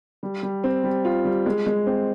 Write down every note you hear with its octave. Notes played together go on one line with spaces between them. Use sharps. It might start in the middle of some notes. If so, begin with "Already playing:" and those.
G3
G3
C4
G3
F4
G3
G#3
G#3
C4